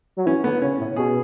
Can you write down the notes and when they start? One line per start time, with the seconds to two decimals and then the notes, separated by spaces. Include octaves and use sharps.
0.17 F#3
0.26 E3 C#4
0.44 D3 B3
0.62 C#3 C#4
0.79 A2
0.96 B2 G#4